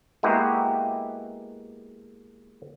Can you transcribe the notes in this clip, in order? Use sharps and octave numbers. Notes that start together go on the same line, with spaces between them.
G#3 A#3 B3 E4 F#4 G4